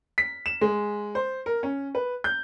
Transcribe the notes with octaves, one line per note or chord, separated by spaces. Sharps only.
B6
E7
G#3
C5
A#4
C#4
B4
G6